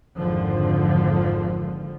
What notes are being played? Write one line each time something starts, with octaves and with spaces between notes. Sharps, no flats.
G#1 F2 D3 F3